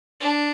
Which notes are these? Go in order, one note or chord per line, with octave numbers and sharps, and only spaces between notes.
D4